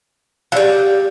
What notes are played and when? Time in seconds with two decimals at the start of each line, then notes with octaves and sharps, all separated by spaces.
0.52 F#3 G3 D5 F5